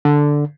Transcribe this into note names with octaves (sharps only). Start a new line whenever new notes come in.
D3